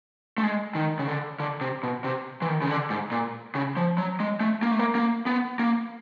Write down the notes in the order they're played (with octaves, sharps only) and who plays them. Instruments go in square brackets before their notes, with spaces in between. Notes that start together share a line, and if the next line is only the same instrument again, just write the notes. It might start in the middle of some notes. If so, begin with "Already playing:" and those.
[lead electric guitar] A3
G#3
D#3
C#3
D3
D3
C3
B2
C3
E3
D#3
C#3
D3
G#2
A#2
C#3
F3
F#3
G#3
A3
A#3
A3
A#3
A#3
B3
A#3